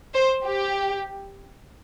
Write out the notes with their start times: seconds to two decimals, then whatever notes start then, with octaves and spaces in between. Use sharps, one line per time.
0.14 C5
0.46 G4